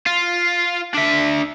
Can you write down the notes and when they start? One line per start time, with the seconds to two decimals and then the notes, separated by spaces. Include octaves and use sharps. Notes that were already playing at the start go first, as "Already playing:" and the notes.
0.06 F4
0.94 D4 E5